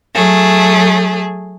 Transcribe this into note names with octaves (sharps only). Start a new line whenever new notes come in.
F#3 A3 G#4